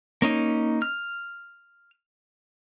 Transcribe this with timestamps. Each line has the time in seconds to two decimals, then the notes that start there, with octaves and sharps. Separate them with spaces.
0.22 A#3 C#4 D#4
0.82 F6